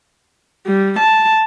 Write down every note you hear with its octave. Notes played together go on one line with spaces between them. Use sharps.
G3
A5